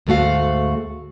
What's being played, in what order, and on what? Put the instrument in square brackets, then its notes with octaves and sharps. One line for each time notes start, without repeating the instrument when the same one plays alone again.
[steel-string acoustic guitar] D2 G#2 A3 F#4 F5